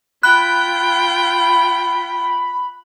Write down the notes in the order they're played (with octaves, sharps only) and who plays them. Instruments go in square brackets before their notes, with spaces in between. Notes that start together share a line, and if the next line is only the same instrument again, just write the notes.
[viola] F4 G5 [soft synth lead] B5 [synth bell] F#6